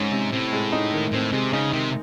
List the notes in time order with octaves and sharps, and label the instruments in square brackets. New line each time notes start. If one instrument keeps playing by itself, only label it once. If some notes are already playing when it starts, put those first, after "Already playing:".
Already playing: [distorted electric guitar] G#2 [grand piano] C3 D#3 G#3 C#4
[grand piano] C3
[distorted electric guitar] A2 [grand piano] C4
[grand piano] G#3
D#4
D#3
[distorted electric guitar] A2 [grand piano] C4
[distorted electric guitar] C3 [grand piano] G#3
[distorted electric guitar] C#3 [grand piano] D#4
[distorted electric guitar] C3 [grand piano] D#3